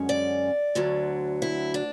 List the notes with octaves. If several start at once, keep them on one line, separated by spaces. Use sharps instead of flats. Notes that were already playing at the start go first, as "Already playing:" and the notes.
Already playing: F#2 D3 G#3 C#4
D5
D2 D3 F#3
E4
D4